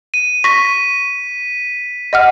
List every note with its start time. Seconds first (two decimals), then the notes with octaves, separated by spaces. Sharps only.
0.14 D#7
0.44 C#6 A#6 B6
2.13 D#5 F#5 F6